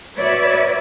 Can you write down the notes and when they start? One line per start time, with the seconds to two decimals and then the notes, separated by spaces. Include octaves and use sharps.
0.15 F#4 B4 C#5 D5 E5